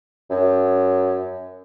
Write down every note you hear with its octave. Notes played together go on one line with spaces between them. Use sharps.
F#2